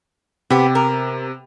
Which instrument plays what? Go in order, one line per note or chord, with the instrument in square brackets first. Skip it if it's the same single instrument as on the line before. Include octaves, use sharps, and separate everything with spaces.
[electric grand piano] C3 [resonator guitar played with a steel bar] B3 G4
[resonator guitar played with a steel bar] A#4